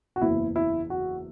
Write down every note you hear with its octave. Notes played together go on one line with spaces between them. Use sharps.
F#4
F#1 E2 E3 E4
E4
F#4